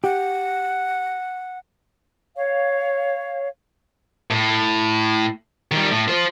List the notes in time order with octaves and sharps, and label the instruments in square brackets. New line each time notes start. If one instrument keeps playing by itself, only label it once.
[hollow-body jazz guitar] G4 [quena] F#5
[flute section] C#5 F5
[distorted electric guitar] A2
D#3 G3
A2
F4 C5